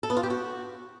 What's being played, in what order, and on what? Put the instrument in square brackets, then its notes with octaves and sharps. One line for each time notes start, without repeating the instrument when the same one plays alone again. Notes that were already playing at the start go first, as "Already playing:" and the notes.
[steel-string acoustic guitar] A4
B3
F4
G4
F#4